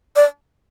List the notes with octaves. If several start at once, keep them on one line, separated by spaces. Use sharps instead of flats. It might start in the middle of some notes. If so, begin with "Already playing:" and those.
D5